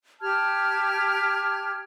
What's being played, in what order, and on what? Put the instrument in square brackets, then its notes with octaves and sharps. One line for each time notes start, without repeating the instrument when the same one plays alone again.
[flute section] G4 A5 F6 G#6